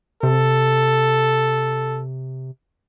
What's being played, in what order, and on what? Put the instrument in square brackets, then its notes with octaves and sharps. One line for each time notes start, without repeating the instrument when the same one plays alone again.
[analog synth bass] C3 [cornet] A4